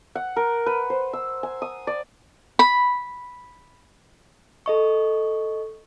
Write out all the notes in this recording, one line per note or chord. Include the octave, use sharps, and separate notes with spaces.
F#5
A#4
B4
C5
E6
G#5
D#6
D5
B5
A4 D#5 C#6